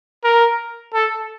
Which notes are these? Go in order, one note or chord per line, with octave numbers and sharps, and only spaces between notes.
A#4
A4